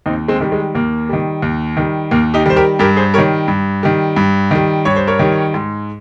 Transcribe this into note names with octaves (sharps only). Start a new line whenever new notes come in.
D#2 C4 D#4
G#3 C4
D#3 G3
G#3
D#2 A#3
D#3 G3
D#2
D#3 G3
D#2 A#3
D#4 G4
D#3 G3 C5
G4 A#4
G2 G4 A#4
G#4 C5
D#3 G3 A#4 C#5
G2
D#3 G3
G2
D#3 G3
G2 C#5
C5
A#4 C#5
D#3 G3
G#2